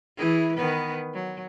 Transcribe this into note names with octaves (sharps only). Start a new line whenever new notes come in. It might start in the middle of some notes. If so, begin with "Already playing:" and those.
E3 E4 G#4
D#3 B3 B4
F#3